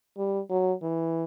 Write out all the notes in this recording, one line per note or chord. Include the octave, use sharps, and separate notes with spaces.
G3
F#3
E3